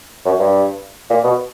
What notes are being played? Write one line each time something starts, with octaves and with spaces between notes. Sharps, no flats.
F#2
G2
A#2
B2